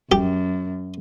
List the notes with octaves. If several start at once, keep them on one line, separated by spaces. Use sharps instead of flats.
F#2 G4